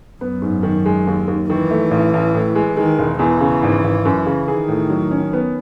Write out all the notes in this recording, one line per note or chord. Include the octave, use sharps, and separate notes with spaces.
F#2 B3
G#2
D#3
G#3
D#2
D#2
D#3 E3
A3
A1
A1
A2
G#3
D#3 G#3
E1
E2 E3
C#3
G#1
G#1
F#2
C#3
D#3 G#4
A2
F#3
C#4
B3